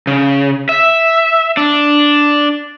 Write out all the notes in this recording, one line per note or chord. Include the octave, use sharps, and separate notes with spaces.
C#3
E5
D4